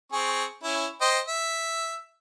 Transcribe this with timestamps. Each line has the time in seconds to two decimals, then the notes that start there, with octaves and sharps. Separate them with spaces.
0.12 C4 G#4 C#6
0.63 C#4 E4
1.01 C5 D#5 G5
1.27 E5